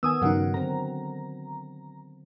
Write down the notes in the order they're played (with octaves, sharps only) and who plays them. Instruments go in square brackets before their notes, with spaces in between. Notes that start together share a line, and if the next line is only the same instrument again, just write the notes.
[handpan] D#3 B3 [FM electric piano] G#5 D#6 E6
[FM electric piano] G2 C#3 D#4 [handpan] F#3 A#4 F#5
[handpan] D3 C4 [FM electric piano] A#5